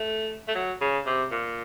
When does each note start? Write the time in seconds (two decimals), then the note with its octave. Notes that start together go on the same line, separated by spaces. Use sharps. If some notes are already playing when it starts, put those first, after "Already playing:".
Already playing: A3
0.48 A3
0.55 F#3
0.81 C#3
1.06 C3
1.31 A#2